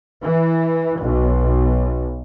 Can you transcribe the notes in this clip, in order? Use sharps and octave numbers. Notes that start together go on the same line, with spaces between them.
E3
B1